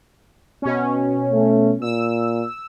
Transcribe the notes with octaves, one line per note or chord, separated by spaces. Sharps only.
B2 C#4
A3
A#2 E6